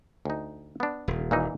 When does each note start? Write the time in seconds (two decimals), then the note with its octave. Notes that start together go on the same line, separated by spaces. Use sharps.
0.25 D2 D#4
0.80 B3 D4
1.08 D#1
1.31 A#2 E3 D#4